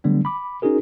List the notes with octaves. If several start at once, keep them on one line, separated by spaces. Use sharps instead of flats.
D3 F#3 G3 A3 B3 D4
B5 D6
C#4 D#4 F#4 G#4 A#4